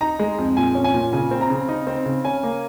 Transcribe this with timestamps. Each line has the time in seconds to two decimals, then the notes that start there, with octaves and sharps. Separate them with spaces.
0.01 D#4 A#5
0.19 G#3
0.38 F2
0.57 A#2 G#5
0.75 C#4
0.84 G#5
0.94 A#2
1.13 C#3 G#5
1.31 C4
1.41 A#5
1.50 C#3
1.69 D#4
1.87 C4
2.06 C#3
2.25 C#4 G#5
2.43 A#3